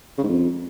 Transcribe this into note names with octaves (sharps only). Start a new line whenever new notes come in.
C#3
G#2
F2